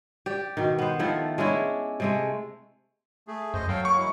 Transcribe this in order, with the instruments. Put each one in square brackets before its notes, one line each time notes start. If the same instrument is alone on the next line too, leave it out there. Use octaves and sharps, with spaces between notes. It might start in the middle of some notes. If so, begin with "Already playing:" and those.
[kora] G4 D5
B2 D#3
B3 C5
D#3 F3 A3 E4
G#3 C#4 D4 E4
C3 G#3 A3
[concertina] A3 G#4
[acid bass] F#2 [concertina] C5 D#5
[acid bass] F#3 [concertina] A4 F5 G5
[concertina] A#3 [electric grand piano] C#6
[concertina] G#3 E4